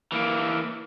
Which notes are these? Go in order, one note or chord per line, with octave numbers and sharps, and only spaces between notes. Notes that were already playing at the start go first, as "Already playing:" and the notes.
E3 A#3